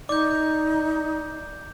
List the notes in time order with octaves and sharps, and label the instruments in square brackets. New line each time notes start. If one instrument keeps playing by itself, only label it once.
[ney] D#4 [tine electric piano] D5 [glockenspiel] D6 G6